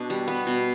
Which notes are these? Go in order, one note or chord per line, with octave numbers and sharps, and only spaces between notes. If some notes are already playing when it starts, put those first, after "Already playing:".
Already playing: B2 D4
G3
B3
B2